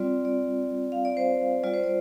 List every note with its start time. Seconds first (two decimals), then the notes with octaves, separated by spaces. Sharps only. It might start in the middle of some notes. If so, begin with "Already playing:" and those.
Already playing: G3 C4 F4 D5
0.25 D5
0.92 F5
1.05 D5
1.17 C5
1.64 G3 F4 D5
1.74 C5
1.84 D5